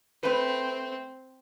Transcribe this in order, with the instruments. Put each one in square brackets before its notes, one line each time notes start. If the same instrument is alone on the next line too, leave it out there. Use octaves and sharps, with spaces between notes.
[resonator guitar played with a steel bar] A3 B4 [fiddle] C4